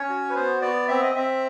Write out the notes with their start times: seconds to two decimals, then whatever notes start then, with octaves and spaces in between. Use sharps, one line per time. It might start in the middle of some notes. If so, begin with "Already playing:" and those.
Already playing: C#4 C#5
0.09 F#4
0.30 B4
0.35 B3 C5
0.61 B3 D5
0.88 C4 E5
1.02 D#5
1.15 C4 E5